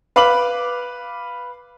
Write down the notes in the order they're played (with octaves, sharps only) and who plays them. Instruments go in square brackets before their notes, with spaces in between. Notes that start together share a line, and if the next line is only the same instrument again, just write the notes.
[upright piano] B4 F5 B5 D6 F#7